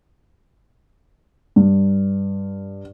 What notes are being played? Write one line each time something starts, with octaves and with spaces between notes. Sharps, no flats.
G2